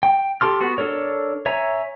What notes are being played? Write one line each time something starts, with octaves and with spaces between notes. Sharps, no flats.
G5
G4 A4 C6 F6
B3 F#4
D4 A4 A#4 C#5
C#5 E5 G#5 A#5